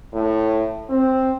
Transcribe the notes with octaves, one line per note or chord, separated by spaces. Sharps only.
A2
C4